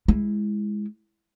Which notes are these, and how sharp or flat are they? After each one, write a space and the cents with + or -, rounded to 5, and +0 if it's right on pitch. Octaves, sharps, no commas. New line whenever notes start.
G#3 +0 E4 +0